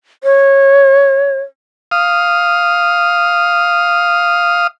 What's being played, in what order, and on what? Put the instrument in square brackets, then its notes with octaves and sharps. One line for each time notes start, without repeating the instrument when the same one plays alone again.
[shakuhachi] C#5
[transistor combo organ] F5 D#6